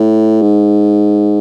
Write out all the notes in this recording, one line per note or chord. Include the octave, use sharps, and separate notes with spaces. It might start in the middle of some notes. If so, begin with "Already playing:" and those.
Already playing: A2
G#2